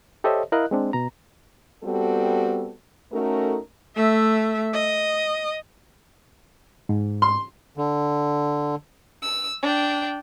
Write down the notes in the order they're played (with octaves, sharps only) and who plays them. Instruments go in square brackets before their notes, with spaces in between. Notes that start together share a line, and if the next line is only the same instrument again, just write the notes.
[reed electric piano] G4 A4 C5 C#5 D#5 E5
E4 A#4 D#5 F5 F#6
G#3 C4 D4
B2 A#5
[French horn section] G3 B3 C4 F#4 A4
A3 C#4 D#4 F#4 A4 A#4
[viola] A3 E5
D#5
[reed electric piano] G#2
[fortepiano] C6
[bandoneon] D3
[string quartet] E6
D4 G5